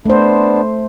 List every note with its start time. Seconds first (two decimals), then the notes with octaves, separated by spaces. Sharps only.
0.06 A3 B3 D4 C5